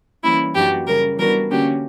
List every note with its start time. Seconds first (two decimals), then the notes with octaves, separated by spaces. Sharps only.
0.23 E3 G3 A#3 C#4 E4
0.55 F#2 E3 A#3 D4 F#4 G4
0.87 C#3 G3 C#4 A#4
1.18 E3 G3 B3 D4 F#4 A#4
1.51 D3 A#3 C#4 F#4 G4